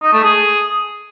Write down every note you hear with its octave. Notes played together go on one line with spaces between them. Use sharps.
D#4
A3
G#4